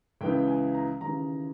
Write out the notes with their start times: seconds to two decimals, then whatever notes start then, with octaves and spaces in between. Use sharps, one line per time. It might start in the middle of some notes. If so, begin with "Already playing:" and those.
0.21 C#2 C#3 E3 G5
0.48 G#5
0.74 A#5
1.01 D#2 C#3 E3 A#5